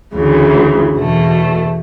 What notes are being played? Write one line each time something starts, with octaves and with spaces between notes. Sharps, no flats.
D2 C#3 E3
E2 B2 A3